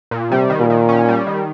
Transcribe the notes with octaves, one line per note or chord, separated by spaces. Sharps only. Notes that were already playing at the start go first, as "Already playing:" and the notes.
A#2
C3 G3
D#3
A#2
D#3
C#4
G3
D#3